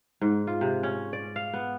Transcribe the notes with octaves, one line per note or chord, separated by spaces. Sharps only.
G#2
F4
C3
C#4
D5
F5
B3